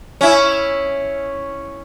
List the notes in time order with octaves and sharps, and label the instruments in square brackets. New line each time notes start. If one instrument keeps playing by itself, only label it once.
[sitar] C#4 E4